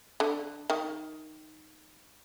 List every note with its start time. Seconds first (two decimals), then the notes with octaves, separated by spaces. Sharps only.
0.20 D3
0.70 D#3